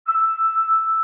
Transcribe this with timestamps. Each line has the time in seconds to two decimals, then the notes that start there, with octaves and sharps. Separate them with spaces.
0.08 E6